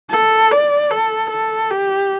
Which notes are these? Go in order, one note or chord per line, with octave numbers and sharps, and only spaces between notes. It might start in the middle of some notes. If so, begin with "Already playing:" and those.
A4
D5
A4
A4
G4